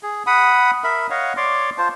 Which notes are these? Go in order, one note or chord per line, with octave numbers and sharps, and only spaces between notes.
G#4
F#5 B5 D#6
A#4 E5 B5
C#5 D#5 F5 F#5
C#5 D5 C6 D6
F4 C5 A5